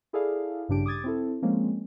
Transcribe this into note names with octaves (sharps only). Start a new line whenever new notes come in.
E4 G#4 A4 D5 F5
A1 G2 C#3 D4 G4 D7
D6 D#6 G#6 A6
C4 E4 A4
F3 G#3 A#3 C4 C#4